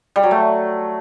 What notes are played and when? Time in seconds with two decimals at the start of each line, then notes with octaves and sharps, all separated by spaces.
0.16 G3
0.23 F#3
0.31 A3